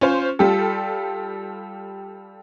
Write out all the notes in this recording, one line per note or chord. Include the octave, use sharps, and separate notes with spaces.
C#4 F4 C5
G3 F4 G4 A4